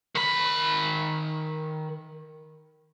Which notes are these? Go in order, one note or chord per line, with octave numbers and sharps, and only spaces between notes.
D#3 B5